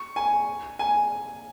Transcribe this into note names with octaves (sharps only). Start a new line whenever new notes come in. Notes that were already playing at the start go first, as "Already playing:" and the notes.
Already playing: C#6
G#5
G#5